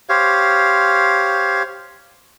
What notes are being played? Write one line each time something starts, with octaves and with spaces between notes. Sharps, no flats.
G4 C5 C#5 F5